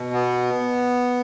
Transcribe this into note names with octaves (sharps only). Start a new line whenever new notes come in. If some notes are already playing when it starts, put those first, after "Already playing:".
Already playing: B2
B3